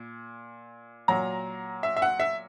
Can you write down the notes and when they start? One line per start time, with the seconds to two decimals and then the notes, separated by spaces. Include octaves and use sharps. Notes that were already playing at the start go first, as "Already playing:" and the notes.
Already playing: A#2
1.08 A#2 F#3 A#5
1.83 E5
1.97 E5
2.02 F#5
2.20 E5